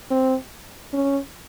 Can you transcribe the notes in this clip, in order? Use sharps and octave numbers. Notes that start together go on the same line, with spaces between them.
C4
C#4